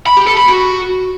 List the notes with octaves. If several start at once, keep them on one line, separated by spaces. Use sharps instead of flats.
B5
G4
A4
B5
F#4